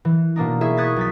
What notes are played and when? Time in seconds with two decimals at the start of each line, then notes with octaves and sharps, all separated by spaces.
0.05 E3
0.36 B2 A#3 D4 D#4
0.61 E4 G#4 E5 C#6 G#6
0.77 C#6 D#6 F#6 G#6 A6 B6
0.96 B1 A6 B6